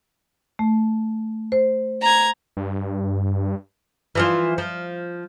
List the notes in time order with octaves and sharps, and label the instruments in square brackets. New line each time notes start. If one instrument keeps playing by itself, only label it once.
[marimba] A3
C5
[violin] A#5 G#6
[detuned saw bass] G2
[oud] E3 F3 F4
F3